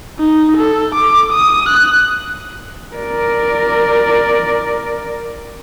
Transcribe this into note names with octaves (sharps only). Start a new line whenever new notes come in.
D#4
A4
D6
D#6
F#6
A#4 D5